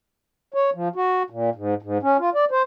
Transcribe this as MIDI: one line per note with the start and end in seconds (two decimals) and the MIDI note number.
0.54 0.70 73
0.74 0.88 53
0.95 1.23 66
1.30 1.50 46
1.55 1.74 44
1.82 1.98 44
2.03 2.17 61
2.19 2.30 65
2.35 2.45 74
2.51 2.62 72